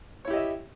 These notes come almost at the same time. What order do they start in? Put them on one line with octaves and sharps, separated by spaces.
C#5 E4 G4 D#5 E5